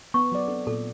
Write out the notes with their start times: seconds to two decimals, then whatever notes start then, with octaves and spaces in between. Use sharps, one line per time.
0.14 B3 C#6
0.32 F#3 D5
0.47 C4 D4 A4
0.67 A#2 A4